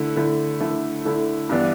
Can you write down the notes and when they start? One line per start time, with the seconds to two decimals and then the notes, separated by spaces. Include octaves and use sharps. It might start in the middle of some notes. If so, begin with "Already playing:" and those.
Already playing: D3 A3 E4
0.16 D3 A3 E4
0.61 D3 A3 E4
1.05 D3 A3 E4
1.49 G2 E3 B3 D4